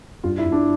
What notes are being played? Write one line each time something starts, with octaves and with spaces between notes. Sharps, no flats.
G2 F4
E4
G2
D4